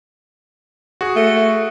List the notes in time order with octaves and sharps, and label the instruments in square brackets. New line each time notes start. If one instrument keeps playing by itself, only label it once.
[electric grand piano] F#4 G#4
[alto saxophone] A3